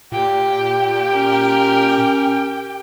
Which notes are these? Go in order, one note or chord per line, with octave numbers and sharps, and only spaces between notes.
A#2 G4 G5
C#4 A#4